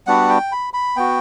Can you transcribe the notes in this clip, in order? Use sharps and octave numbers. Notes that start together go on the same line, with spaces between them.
G3 B3 D4 F#4 F#5
G5
B5
B5
B3 F#4 G5